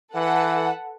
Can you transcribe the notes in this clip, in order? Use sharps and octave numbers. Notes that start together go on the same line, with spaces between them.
E3 A4 B4 F#5